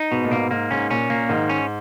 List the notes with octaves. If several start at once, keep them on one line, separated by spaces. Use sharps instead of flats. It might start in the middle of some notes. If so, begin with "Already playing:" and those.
Already playing: D#4
G#2 B2
A#2
G#2 A#3
G#2 A#3
G#2 C#4
A#2 C#4
A#2 A#3
G#2 D#3
C#4